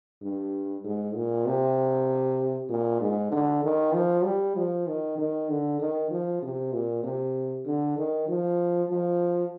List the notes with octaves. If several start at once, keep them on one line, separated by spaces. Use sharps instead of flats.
G2
G#2
A#2
C3
A#2
G#2
D3
D#3
F3
G3
F3
D#3
D#3
D3
D#3
F3
C3
A#2
C3
D3
D#3
F3
F3